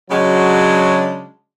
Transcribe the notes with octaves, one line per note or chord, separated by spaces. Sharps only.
C#3 F#3 G#3 D4 F#4